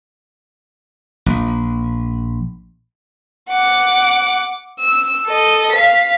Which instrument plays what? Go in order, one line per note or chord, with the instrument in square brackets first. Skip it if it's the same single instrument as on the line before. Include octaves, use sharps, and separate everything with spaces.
[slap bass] A#1
[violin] F#5 D6
E6
A4 D#5
F5 B6